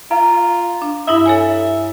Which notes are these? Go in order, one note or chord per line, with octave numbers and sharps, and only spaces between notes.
F4 F5 A#5
D4
G2 E4 E5 D#6
A4 C#5 G#5